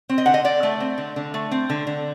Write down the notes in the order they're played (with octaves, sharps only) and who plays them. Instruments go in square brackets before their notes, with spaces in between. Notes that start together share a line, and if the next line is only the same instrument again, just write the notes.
[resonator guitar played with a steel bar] C4
D#5
D3 F#5
D#5
D3 D5
A3
C4
D3
D3
A3
C4
D3
D3